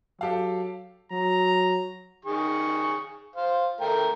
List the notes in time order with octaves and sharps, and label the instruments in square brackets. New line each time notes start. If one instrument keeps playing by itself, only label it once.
[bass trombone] F#3 [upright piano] G4 A4 F5
[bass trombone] F#3 [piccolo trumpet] A#5
[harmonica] D#3 G#4 C#6
C5 F5
A3 A#4 G5